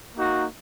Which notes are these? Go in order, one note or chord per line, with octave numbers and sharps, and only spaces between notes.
A#3 D#4 F#4